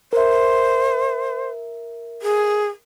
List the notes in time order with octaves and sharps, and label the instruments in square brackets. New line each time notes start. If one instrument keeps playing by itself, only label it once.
[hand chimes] A#4 E5 [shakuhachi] C5
[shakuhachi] G#4